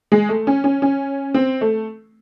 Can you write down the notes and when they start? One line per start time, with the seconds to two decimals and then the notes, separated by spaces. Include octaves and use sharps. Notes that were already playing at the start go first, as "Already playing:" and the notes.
0.12 G#3
0.29 A3
0.47 C#4
0.64 C#4
0.82 C#4
1.34 C4
1.61 A3